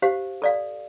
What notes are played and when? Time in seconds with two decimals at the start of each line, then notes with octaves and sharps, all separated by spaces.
0.02 G4 C5 F5
0.42 A4 D5 F5